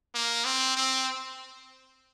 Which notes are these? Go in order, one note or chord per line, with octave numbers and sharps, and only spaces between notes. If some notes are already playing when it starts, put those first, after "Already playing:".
A#3
C4
C4